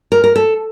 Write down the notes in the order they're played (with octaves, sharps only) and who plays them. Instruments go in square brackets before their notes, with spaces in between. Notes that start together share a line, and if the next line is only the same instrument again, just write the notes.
[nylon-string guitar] A#4
A#4
A4